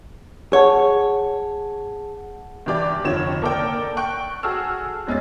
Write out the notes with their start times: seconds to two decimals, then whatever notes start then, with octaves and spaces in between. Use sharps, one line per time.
0.53 G#4 C#5 F#5 A5
2.66 G2 E3 G4 D5
3.04 F1 D3 D#3 F3 C#5 E7
3.42 A#3 A4 A#4 D5 G5
3.97 G5 C#6 F#6
4.43 F#4 G#4 A4 E6 F6
5.07 F1 G#3 C#4 A6